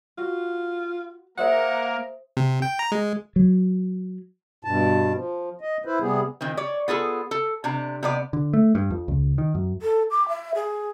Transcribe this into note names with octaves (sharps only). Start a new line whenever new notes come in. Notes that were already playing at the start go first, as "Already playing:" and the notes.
F4 F#4
A#3 G#4 A#4 C5 E5 F#5
C3
G5
A#5
G#3
F#3
G2 B2 A5
F3
D#5
E4 B4 C5
C3 G3 B3 G#4
A#2 D#3 C4
C#5 D5
B3 F4 G#4 A4
A4
C3 D4 A#5
C3 B3 D5
D3
A3
G2
F2
C#2
D#3
F#2
A4
D6
E5
G#4